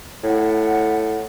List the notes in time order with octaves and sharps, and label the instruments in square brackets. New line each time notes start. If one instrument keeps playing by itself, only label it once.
[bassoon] A2 [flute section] F#5